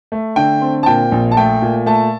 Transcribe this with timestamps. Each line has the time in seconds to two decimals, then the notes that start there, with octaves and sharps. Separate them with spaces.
0.12 A3
0.36 D3 G5
0.61 C4
0.83 A5
0.86 A#2 G5
1.12 A#1
1.31 A5
1.37 A3 G5
1.62 A#2
1.86 A3 A5